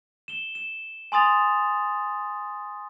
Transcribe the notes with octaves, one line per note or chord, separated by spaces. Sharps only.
E7 G7
E7
G#5 C6 D#6 A6 F7